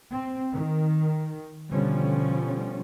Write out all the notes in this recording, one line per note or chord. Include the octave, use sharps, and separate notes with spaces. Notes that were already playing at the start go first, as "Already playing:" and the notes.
C4
D#3
B2 D3 F3 G3 C#4